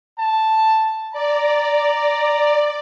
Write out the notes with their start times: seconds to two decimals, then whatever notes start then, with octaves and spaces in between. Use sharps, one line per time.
0.18 A5
1.13 D5 A#5